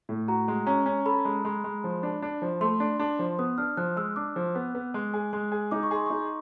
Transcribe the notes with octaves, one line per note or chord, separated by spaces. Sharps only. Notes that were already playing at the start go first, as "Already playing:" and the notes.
A2
F#4 A#5
G#3
C#4 A#5
C#4
A4 B5
G#3
G#3
G#3
F3
D4
D4
F3
A3 C6
D4
D4
F3
B3 D#6
D4 F6
F3 F#6
G#3 E6
D4 D6
F3
B3
B3
G#3
G#4
G#3
G#4
D#4 D6
C#6
G#4 C6
D#4 C#6